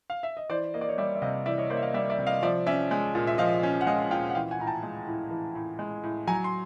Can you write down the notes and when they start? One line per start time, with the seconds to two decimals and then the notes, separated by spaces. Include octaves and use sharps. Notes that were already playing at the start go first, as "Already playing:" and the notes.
0.10 F5
0.23 E5
0.37 D#5
0.49 E3 C5 D5
0.74 A#3 D#5
0.81 D5
0.89 C#5 D#5
0.98 G3 D5 E5
1.15 E5
1.22 C3 D#5 F5
1.46 E3 D5 E5
1.58 C#5 D#5
1.70 A#3 C5 D5
1.77 E5
1.82 D#5 F5
1.94 G3 D5 E5
2.10 D5 E5
2.19 C3
2.27 D#5 F5
2.42 F3 D5 E5
2.66 C#4 D5 E5
2.91 G#3
3.15 A#2
3.27 E5
3.38 F3 D#5 F5
3.63 C#4
3.81 F#5
3.87 G#3 D#5 F5
4.10 A#2 F5 G5
4.30 F#5
4.35 E3 F5 G5
4.51 F#5 G#5
4.59 A2 A#5
4.66 G5 A5
4.83 G#3
5.07 A2
5.31 E3
5.55 A2
5.79 G#3
6.03 A2
6.27 F#3 G#5 A#5
6.44 C6